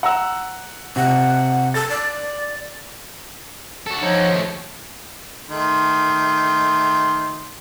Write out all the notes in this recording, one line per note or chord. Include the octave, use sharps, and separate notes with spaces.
F#5 A#5 E6
C3 F#5
A4 A6
D5
F#4 A4
F3 D#4 C#5
D#2 A3
D#3 A3 C6